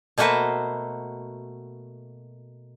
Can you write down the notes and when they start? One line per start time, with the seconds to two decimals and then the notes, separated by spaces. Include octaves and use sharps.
0.18 B2 A3 A#3 F#4 B4 C5